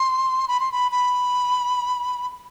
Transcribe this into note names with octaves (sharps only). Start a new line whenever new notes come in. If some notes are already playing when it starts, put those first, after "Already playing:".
Already playing: C6
B5
C6
B5
B5